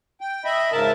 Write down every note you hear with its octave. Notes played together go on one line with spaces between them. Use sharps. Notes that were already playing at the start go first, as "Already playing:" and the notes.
G5
D#5 E5 B5
G#2 C#3 A#4 E5 A5